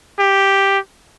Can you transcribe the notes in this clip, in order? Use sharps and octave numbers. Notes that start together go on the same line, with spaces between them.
G4